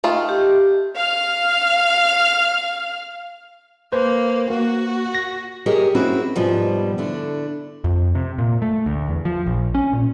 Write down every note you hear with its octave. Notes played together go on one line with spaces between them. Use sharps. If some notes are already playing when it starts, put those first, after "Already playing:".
D#3 A3 F4
G4
F5 F6
A#3 B4 C5
A#3 F#4
A#6
G4 G#4 A#4 C#5 D#5 E5
A#3 C4 C#4 E4 F#4
G#2 B2 F3 G3
D3 A3 D4 E4
F2
C3
A#2
A3
D2
E2
F3
A#1
C#4
A#2